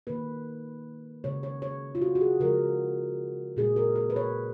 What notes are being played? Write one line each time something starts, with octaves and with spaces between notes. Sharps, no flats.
D#3 A#3 B4
C#3 G#3 C#5
C#5
C#5
F4
F#4
F#4
G#4
C#3 F3 G#3 A#4
A#2 G#3 G#4
A#4
A#4
B4
C#5